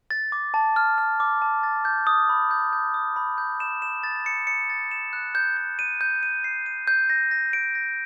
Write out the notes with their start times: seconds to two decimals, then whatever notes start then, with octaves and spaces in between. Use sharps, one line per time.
0.11 A6
0.32 D6
0.54 A5
0.76 F6
0.98 F6
1.20 D6
1.42 A5
1.63 A6
1.85 G6
2.07 D#6
2.29 B5
2.51 G6
2.73 G6
2.94 D#6
3.16 B5
3.38 G6
3.60 E7
3.82 E7
4.04 A6
4.26 C#7
4.47 C#7
4.70 A6
4.91 E7
5.13 F#6
5.35 G6
5.57 G6
5.79 D#7
6.01 G6
6.23 D#7
6.44 C7
6.66 D#7
6.88 G6
7.10 A#6
7.31 A#6
7.53 D7
7.75 A#6